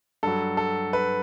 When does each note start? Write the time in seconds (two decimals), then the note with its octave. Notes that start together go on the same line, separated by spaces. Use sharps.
0.23 G2 F#3 A4
0.57 A4
0.93 B4